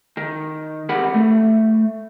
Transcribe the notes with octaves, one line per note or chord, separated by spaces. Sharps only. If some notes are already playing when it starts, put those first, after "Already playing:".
D#3
E2 C3 G4 A#4 F#5 B5
A3